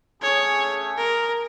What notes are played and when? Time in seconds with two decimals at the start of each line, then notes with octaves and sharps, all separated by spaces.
0.22 A3 C#4 G#4 C#5
0.98 A#4